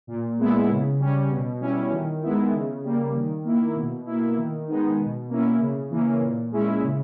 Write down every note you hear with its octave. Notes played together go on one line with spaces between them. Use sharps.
A#2
G#3 B3 E4
C#3
G3 C#4
B2
G3 C#4 E4
D#3
G#3 B3 E4
C#3
G3 A#3
D#3
A#3 E4
B2
A#3 E4
D#3
G#3 B3 D#4
B2
A#3 C#4 E4
C#3
E3 A#3 C#4
A#2
G#3 C#4 E4
C#3